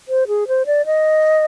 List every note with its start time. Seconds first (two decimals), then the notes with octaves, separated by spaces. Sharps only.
0.08 C5
0.27 G#4
0.48 C5
0.66 D5
0.86 D#5